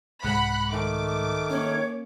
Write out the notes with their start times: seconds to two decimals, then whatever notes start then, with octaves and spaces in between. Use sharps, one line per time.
0.24 C2 G#2 G#3 F#5 B5 F#6
0.71 D#3 A3 D6
1.50 A#3 C#4 C#5